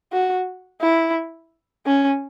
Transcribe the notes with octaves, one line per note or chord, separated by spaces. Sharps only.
F#4
E4
C#4